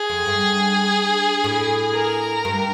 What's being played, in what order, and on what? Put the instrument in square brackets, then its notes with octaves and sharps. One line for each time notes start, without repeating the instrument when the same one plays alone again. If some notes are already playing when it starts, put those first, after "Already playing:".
Already playing: [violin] G#4
[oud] F2
G2
A2
[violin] A#4
[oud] G2